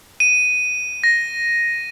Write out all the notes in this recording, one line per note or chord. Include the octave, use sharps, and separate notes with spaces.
D#7
A#6